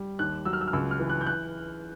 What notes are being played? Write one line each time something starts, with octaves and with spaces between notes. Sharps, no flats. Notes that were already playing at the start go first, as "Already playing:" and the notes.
Already playing: G3
D#2 F#6
F#3 E6
F6
E6
F6
C#2 E6
F6
E3
F#6
G6
F#6